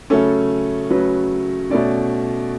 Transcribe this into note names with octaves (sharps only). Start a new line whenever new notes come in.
C#3 F#3 A3 C#4 A4
C#3 F#3 A3 C#4 B4
B2 A3 C#4 D5